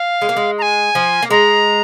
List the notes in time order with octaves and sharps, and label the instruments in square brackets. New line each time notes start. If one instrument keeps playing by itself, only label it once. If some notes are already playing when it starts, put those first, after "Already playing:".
Already playing: [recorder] F5
[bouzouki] G#3
A#3
G#3
[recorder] A#5
G#5
[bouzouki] F3
A#3
[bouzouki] G#3 [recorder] A#5